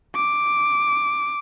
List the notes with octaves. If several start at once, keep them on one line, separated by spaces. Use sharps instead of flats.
D6